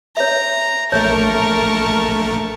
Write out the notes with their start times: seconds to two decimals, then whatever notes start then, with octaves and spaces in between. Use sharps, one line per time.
0.17 C#5 E5 A#5
0.92 A#1 A3 A#4 C#5 E5 A5 C#6